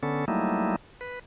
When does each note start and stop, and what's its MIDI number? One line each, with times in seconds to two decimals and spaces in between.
0.03 0.25 50
0.03 0.25 59
0.03 0.25 61
0.03 0.25 69
0.28 0.76 54
0.28 0.76 55
0.28 0.76 57
0.28 0.76 58
0.28 0.76 63
0.28 0.76 64
1.01 1.19 71